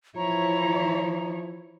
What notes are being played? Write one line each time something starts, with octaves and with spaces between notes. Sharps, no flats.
E3 F3 E4 C#5 A#5